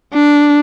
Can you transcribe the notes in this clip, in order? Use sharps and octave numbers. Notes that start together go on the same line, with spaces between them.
D4